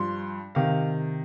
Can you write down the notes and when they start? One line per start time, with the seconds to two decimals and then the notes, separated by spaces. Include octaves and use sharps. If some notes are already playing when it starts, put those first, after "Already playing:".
Already playing: G2 F3 C6
0.55 C3 D#3 F5